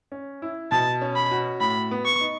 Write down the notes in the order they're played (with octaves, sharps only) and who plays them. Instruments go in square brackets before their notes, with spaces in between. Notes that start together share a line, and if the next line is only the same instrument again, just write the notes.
[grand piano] C#4
E4
[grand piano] B2 [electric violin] A5
[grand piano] C#4
[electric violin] B5
[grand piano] F#4
[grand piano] A2 [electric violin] B5
[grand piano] B3
[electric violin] C#6
[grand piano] D#4